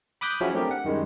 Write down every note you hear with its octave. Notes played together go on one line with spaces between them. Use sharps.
B5 D6 D#6 F#6 G6 B6
F3 F#3 C#4 E4 F#4 G#4
A3 C4 D4 G4 A#4
F#5
F#2 D#3 G3 G#3